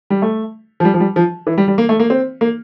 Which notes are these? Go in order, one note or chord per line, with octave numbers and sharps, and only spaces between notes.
G3
A3
F3
G3
F3
G3
F3
E3
G3
G3
A#3
A3
A#3
C4
A#3